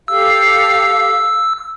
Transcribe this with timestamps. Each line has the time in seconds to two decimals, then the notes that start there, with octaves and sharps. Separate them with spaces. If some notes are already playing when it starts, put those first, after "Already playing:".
0.08 G4 A4 F5 E6